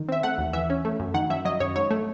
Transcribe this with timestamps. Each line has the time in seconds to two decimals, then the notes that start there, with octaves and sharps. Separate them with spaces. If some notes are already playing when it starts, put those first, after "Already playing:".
Already playing: D#3
0.09 C4 E5
0.23 A3 F#5
0.38 D#2
0.53 E3 E5
0.70 C#4
0.85 A3
1.00 F#2
1.14 D#3 F#5
1.30 F#2 E5
1.45 F#3 D#5
1.60 F#2 C#5
1.76 G#2 C#5
1.91 A3